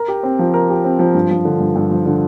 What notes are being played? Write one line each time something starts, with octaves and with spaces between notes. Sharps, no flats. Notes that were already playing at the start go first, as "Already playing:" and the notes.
Already playing: A#4
G4
C4
F3
A#4
G4
C4
F3
G2
F3
D3
G2
G2
F3
D3